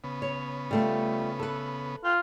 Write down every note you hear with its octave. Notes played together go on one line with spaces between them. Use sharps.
C#3 B3
C#5
G3 A3 F4
A4 B4
F4 G5